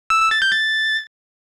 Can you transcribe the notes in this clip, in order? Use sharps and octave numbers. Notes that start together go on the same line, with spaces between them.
E6
E6
A6
G6
A6